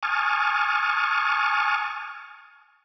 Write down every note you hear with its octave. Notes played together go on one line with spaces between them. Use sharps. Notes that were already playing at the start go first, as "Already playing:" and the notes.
G#5 A5 C#6 D#6 F6